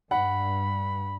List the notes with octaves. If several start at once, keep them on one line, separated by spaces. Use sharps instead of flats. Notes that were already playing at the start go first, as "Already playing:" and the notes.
G2 F#5 B5